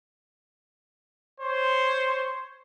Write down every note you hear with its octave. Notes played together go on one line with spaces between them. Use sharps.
C5 C#5